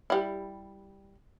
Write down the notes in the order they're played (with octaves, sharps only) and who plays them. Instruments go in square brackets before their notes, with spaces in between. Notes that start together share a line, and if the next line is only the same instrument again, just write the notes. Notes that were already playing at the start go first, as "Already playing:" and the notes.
[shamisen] G3 E4